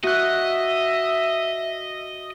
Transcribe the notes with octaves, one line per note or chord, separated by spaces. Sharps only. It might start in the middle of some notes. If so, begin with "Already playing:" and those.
F#4 D#5 E5 F#6